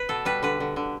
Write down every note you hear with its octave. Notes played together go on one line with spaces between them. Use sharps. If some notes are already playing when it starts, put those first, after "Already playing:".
Already playing: B4
B2 A4
G3 B4
D3 B4
D3
D3